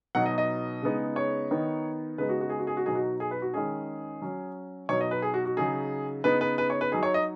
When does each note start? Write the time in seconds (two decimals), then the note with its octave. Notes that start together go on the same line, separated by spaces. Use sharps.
0.15 B2 F#3 B3 D#4 F#5
0.26 D#5
0.38 D#5
0.82 C#3 G#3 B3 D#4
1.16 C#5
1.51 D#3 B3 D#4
2.18 C#3 G#3 B3 D#4 B4
2.29 F#4
2.41 F#4
2.49 G#4
2.59 F#4
2.67 G#4
2.77 F#4
2.86 B2 F#3 D#4 G#4
2.95 F#4
3.20 G#4
3.31 B4
3.42 F#4
3.54 D#3 G#3 C#4 G#4
4.22 F#3 C#4
4.89 B2 F#3 D#4 C#5
5.01 D#5
5.11 B4
5.22 G#4
5.34 F#4
5.45 F#4
5.57 C#3 F#3 D#4 G#4
6.24 C#3 B3 D#4 B4
6.41 B4
6.58 B4
6.70 C#5
6.81 B4
6.92 F#3 D#4 G#4
7.03 C#5
7.14 D#5